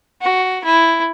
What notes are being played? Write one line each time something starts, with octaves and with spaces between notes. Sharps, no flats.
F#4
E4